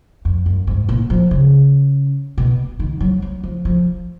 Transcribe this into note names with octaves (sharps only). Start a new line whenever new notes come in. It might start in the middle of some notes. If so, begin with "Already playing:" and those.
F2
F#2
G#2
A#2
F3
C#3
B2
D#3
F#3
F#3
F3
F3